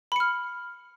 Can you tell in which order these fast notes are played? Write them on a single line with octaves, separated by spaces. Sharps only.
B5 C#7 F6